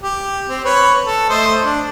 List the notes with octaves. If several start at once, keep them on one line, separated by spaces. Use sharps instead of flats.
G4
C4
B4 C#5
A4
A3 C5 D#5
D4